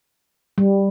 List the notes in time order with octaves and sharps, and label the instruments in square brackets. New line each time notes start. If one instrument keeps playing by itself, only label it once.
[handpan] G3